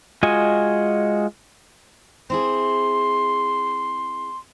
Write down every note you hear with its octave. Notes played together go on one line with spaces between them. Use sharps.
G#3 F4 F#4 D#5 G#5
C4 E4 G#4 C6